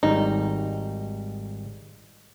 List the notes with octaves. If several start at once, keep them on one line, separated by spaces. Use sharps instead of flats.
G#1 G3 D#4